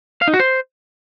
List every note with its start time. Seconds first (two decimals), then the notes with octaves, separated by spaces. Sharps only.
0.22 F5
0.28 D#4
0.34 F#4
0.40 C5